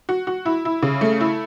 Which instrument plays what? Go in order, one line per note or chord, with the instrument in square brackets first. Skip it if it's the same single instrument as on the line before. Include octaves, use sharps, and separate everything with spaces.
[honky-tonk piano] F#4
F#4
E4
E4
C#3
A3
E4